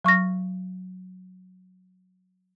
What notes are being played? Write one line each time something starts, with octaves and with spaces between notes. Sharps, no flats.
F#3 C#6 F6 A#6